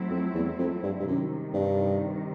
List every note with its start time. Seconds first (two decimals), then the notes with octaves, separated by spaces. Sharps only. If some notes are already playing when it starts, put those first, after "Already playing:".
Already playing: F#3 A3 C4 E4
0.10 F2
0.34 E2
0.59 F2
0.83 G2
1.00 G2
1.07 F#2 C3 D#3 G3
1.54 G2